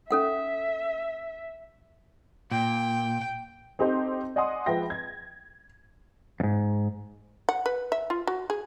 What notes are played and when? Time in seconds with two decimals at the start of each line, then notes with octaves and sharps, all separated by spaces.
0.11 C#4 A4 E5 F#5
2.51 A#2 G5
3.79 C4 D#4 G4 A4 C5
4.36 D5 D#5 F#5 G#5 C6 D#6
4.66 F3 G#3 B4 E5 G5 A#6
4.90 G#6
6.40 F2 G#2
7.49 F#5
7.66 B4
7.92 E5
8.10 F4
8.27 F#4
8.50 G#4